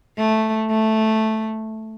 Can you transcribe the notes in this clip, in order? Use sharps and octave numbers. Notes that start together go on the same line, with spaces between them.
A3
A3